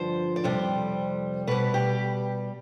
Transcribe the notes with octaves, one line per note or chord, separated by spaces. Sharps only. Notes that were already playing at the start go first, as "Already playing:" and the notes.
Already playing: G2 D3 F3 C5
D5
F2 C3 G3 C5
B2 G3 B4
G4